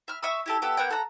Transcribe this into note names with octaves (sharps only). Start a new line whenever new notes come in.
E5 F6
E5 C#6 D#6 E6
E4 G4 A4
B3 G4 A4 E5
A#3 B3 F#5 G5
A4 F#5 A5 A#5